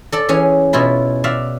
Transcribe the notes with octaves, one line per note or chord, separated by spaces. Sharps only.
A4 D5 A5
E3 C#4 G#4
B2 C#4 E4 F4 B5
F#4 D5 E5 F5